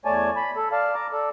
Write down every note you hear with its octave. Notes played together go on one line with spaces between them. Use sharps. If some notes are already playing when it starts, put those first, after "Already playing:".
E2 A3 C#5 D5 G#5 A5
B5
A4
D5 F5 A5
A#5 D6
A4 D5